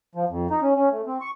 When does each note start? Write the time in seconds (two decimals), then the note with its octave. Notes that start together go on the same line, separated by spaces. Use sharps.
0.15 F3
0.29 F2
0.50 D#4
0.62 C#4
0.76 C#4
0.91 A3
1.06 C4
1.21 C#6